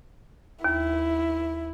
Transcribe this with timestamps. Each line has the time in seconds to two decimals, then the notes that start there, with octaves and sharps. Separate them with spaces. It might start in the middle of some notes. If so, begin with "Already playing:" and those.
0.64 D#2 E4